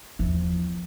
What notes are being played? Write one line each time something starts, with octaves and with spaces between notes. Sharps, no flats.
E2 F3